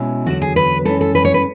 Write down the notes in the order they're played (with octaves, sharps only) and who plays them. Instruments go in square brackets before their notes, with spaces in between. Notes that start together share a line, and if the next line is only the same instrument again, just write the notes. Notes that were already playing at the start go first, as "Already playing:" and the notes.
Already playing: [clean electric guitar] B2 G#3 C#4 E4
[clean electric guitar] E2 D3 F#3 [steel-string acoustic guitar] F#4
[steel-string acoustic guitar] G#4
B4
[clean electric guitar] F#2 E3 G#3 C#4 [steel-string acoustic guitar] A4
[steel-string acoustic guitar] A4
B4
C#5
B4